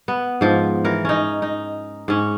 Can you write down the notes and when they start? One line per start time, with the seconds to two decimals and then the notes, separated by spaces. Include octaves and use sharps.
0.08 B3
0.41 G#2 F3
0.84 E3 A#4
1.05 C#4 D#4
1.42 D#4
2.08 G#2 C#4